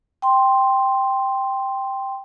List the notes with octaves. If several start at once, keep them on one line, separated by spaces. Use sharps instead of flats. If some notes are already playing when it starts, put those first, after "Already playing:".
G5 C6